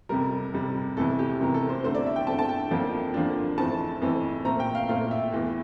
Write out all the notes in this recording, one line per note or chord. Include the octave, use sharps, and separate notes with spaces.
F2 C3 G3 A#4
F2 C3 G3
F2 C3 E3 A3 A4
G4
F2 C3 E3 A3 A#4
A4
C5
D3 A3 C4 C5
D5
E5
G5
D3 A3 C4 A5
A5
G5
F2 D3 F3 A#3 D4
F2 D3 F3 A#3 D4
F2 E3 A3 C4 A5
F2 E3 A3 C4
A#2 A3 C4 A#5
G5
F5
A#2 A3 C4 F5
E5
E2 E3 A3